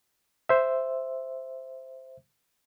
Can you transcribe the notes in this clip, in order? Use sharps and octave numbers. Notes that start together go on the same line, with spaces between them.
C5 E5